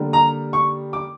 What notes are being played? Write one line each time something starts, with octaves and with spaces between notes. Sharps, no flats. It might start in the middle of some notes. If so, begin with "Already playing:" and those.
Already playing: D3 G3 A#3
A#5
C#6
D6